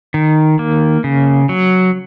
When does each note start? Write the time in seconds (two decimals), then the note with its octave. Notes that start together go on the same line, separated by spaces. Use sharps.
0.14 D#3
0.59 A#3
1.04 C#3
1.49 F#3